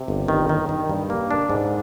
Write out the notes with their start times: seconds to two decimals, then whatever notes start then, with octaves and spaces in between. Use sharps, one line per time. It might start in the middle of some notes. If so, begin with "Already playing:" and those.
Already playing: C3
0.08 G1
0.28 D#3
0.49 D#3
0.69 D#3
0.90 G2
1.10 A#3
1.31 D4
1.50 G#2